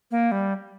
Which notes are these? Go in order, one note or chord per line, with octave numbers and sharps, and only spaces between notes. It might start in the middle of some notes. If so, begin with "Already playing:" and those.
A#3
G3